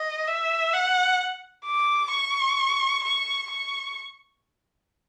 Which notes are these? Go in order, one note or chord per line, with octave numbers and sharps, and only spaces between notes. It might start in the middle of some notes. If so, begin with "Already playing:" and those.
Already playing: D#5
E5
F#5
D6
C#6
C#6
C#6